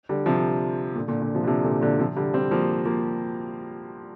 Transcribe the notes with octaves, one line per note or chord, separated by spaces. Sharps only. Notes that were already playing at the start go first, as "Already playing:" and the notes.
D3 G3
C3 F3
A#2 D3
A#2 D3
A#2 D3
C3 F3
D3
C3 F3
A#2 D3
A#2 D3
C3 F3
D3 G3
G3 C4
F3 A#3
F3 A#3